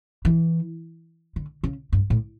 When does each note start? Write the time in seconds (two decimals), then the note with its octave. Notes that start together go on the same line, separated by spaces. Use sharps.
0.25 E3
1.36 D3
1.63 C#3
1.93 G2
2.10 A2